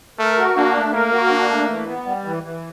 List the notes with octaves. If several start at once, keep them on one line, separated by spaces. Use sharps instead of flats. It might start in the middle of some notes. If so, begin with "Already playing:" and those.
A3 A#4
F#4
A#3 D4
A3
A#3 A#4
F#4
D4
A3
E3
B3
G3
E3
E3